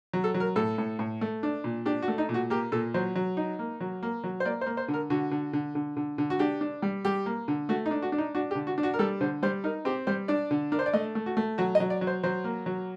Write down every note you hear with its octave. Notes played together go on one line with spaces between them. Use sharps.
F#3
A4
F#3
A#4
A2 A4
A2
A2
A3
D4
A#2
D4 G4
F#4
A3
D#4
A#2
F#4
A#3 G4
A#2 A4
F#3 C5
F#3
D#4
A#3
F#3
A#3
F#3
C5
A#3 D5
C5
A#3
C5
D3
A#4
D3 F#4
D3
D3
D3
D3
D3
F#4
D4 G4
D4
G3
G3 G4
A#3
D3
A3 F#4
D#4
D4
F#4
D4
D#4
D4 F#4
G4
D3
F#4
D4
F#4
A#4
G3 A4
D3 C5
G3 C5
D#4 A#4
C4 G4
G3 C5
D4 D5
D3
D4 A#4
C5
D5
A3 D#5
A3
F#4
A3
F#3 F#4
D#5
F#3
D5
F#3
C5
F#3 C5
A#3
F#3